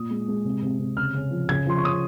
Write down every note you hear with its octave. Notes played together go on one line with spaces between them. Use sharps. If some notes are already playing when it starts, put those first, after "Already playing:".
Already playing: A#2 D#6
G#3
G#3
C3
C3
C3
C#3 F6
C#3
F3
C#3 G#6
F3 C6
C#6
C#3 D#6